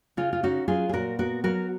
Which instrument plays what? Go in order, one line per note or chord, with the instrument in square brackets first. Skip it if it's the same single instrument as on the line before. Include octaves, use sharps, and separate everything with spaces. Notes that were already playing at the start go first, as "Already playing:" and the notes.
[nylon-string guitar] C#3 F4
F4
C#4 D#4 F#4
F#3 F4 G#4
G#4
A#2 F#4 A#4
B3 F#4 A#4
F#3 F#4 A#4